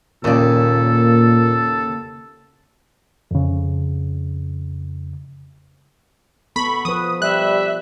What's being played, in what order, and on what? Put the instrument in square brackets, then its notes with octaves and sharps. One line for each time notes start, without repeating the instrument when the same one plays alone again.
[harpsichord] D#2 [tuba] A#2 [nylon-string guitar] C#3 D5 [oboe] A4
[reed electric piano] F2 C#3
[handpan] B3 A4 [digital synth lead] B5 [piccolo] C#6
[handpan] F3 B4 [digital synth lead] D#6
[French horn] G3 [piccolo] E5 [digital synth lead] F#6